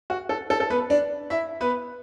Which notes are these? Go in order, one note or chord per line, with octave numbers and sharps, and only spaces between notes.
F#4
A4
A4
A4
B3 B4
D4 D5
E4 E5
B3 B4